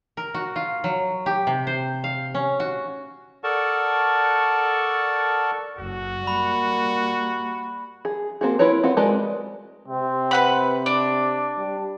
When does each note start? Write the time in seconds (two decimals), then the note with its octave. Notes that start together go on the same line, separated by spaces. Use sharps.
0.17 A#4
0.34 F#4
0.56 F4
0.84 F#3
1.26 G4
1.47 C3
1.67 C5
2.04 F5
2.34 C#4
2.60 F#4
3.44 A4 A#4 D5 F#5 A5 C#6
5.79 F#1 F#4
6.27 G3 A#3 B5
8.05 G#4
8.41 A#3 C4 F#4 G#4
8.59 E4 F4 A#4 B4 C#5
8.83 C4 F4 F#5
8.97 G#3 F#4 A#4 B4 D5
9.88 C3 C4
10.31 B4 F#5 B5
10.86 D4 D5
11.58 G3